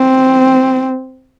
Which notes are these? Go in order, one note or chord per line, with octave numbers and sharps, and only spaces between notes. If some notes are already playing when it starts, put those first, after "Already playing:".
Already playing: C4